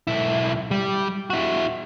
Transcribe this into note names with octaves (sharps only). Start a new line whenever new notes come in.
B1 E4
G3
E4 F#4